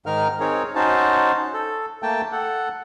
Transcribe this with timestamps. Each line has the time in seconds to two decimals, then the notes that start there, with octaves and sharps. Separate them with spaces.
0.06 G#2 D#3 D#4 A#4 F6
0.40 C4 D#4 G#4 A#4 C#5
0.75 C#4 D#4 F#4 C5 A5
1.54 A4
2.03 A3 A#3 G5 A5
2.32 A4 F#5